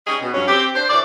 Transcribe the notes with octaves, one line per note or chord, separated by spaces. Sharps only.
G3 C#4 D#4 G#4 C#5 D#5
B2
G2 F#3 C#4
C4 G4
D4 C5
D2 E3 C#5 D5